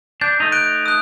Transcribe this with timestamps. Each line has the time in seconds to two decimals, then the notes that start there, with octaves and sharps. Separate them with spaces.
0.21 D4 G6
0.40 A3 D#4
0.52 F#6 D7
0.86 D#6 F#6